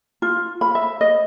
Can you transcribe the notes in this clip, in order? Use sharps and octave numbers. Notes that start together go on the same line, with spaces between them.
F4
B5
E5
D#5